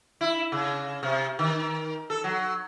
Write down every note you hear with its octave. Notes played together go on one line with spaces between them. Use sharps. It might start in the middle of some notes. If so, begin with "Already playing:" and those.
E4
C#3
C3
D#3
A4
F#3